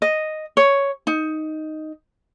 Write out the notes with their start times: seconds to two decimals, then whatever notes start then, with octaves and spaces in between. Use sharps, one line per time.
0.02 D#5
0.57 C#5
1.07 D#4